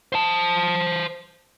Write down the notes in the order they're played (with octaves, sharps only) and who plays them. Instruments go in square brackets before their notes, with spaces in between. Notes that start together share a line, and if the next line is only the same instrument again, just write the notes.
[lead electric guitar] C5 A5